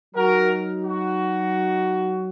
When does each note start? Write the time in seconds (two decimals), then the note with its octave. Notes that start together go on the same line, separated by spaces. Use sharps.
0.15 F#3 D#4 F#4 A#4
0.83 F#4